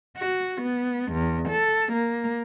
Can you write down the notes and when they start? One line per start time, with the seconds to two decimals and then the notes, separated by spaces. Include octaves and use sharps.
0.18 F#4
0.62 B3
1.13 E2
1.49 A4
1.93 A#3